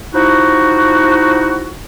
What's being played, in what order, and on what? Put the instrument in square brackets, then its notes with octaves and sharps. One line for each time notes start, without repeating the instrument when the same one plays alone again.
[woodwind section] F3 D#4 E4 F#4